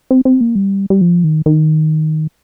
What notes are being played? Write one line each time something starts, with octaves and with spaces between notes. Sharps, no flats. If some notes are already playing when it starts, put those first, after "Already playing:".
C4
C4
A#3
G3
G3
F3
D#3
D#3